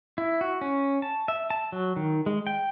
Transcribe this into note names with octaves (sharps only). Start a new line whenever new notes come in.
E4
F#4
C#4
A5
E5
A5
F#3
D#3
G#3
G5